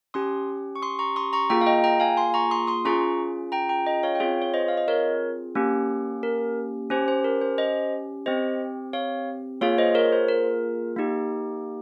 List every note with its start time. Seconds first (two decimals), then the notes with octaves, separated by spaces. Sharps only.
0.14 C#4 G4 C6 D#6
0.76 C#6
0.82 C6 D#6
0.99 A#5 C#6
1.16 C6 D#6
1.33 A#5 C#6
1.50 A#3 F4 G#4 G5 A#5
1.61 F5
1.66 D#5 G5
1.84 G5 A#5
2.00 F5 G#5
2.17 G#5 C6
2.34 A#5 C#6
2.51 C6 D#6
2.67 C6 D#6
2.85 C#4 F4 G#4 A#5 C#6
3.52 G5 A#5
3.69 G5 A#5
3.86 D#5 G5
4.03 C#5 F5
4.15 G5
4.20 C4 F4 G#4 C#5 F5
4.42 C#5
4.54 C5 D#5
4.68 F5
4.77 D#5
4.88 A#4 C#5
5.55 A#3 C#4 G4
6.23 A#4
6.90 C#4 G4 C5
7.08 C5
7.24 A#4
7.41 C5
7.58 C5 D#5
8.26 C4 G4 C5 D#5
8.93 C#5 F5
9.61 A#3 F4 G#4 C#5 F5
9.78 C5 D#5
9.95 A#4 C#5
10.12 C5
10.28 A#4
10.96 A#3 D#4 G4